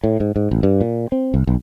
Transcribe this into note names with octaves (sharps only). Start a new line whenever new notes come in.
A2
G#2
G#2
A1
G2
A#2
C4
C2
B1